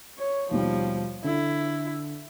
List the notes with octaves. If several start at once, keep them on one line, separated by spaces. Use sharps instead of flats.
C#5
D#2 B2 F3 G3
D3 E4